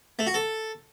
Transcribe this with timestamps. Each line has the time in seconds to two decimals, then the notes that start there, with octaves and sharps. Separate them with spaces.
0.19 A3
0.27 F#4
0.34 A4